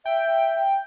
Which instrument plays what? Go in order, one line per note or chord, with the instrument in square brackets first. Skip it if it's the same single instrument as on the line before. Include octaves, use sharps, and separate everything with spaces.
[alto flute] E5 [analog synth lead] G5